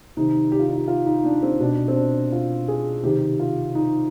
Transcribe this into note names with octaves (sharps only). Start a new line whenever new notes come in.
C3 D#3 D#4
G4
F4
D#4
F4
F4
D#4
D4
C4
B2 D4
C4
D4
F4
G#4
C3 D#3 G4
F4
D#4